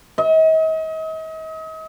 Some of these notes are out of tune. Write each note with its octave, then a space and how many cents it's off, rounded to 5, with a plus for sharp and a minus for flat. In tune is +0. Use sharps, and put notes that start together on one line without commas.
D#5 +40